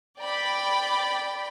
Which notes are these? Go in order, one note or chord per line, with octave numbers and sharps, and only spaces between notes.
D5 G5 B5